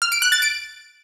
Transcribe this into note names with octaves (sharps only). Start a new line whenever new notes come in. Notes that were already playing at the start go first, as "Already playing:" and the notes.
F6
D7
F#6
A6
D7